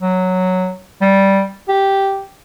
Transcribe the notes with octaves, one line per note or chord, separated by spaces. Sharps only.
F#3
G3
G4